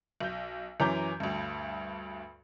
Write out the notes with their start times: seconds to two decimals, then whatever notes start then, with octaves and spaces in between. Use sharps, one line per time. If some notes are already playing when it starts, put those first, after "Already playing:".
0.21 B1 G6
0.80 F#2 E3 C#4 A#5 D6 G6
1.20 D2 G2